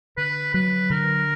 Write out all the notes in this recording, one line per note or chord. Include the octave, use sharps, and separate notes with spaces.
D3 B4
F#3 B4
D3 A#4